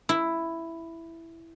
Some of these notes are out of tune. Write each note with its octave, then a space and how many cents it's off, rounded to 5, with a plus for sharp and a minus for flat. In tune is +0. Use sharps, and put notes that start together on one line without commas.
E4 +5